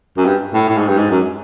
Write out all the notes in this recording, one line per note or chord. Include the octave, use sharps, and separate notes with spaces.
F#2
G2
A2
A2
G#2
G2
G#2
F#2